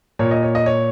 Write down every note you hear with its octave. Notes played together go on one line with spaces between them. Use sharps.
A#2 C#5
D#5
C#5
D#5
C#5